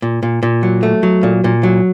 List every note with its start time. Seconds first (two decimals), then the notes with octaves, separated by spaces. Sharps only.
0.02 A#2
0.23 A#2
0.43 A#2
0.63 F#3
0.83 A3
1.03 F#3
1.23 A#2
1.44 A#2
1.63 F#3